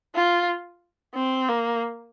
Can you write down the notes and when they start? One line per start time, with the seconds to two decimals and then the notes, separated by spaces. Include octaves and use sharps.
0.15 F4
1.15 C4
1.49 A#3